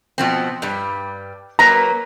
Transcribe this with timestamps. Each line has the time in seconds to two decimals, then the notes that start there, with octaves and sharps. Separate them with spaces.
0.18 B2 F3 C4
0.62 G2 G3
1.59 F#3 A#3 B4 A#5